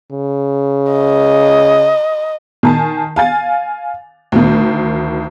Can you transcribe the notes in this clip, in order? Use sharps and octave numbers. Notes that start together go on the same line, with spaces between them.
C#3
D#5
D#3 G#5 A5
F5 G#5 A6
D2 D#3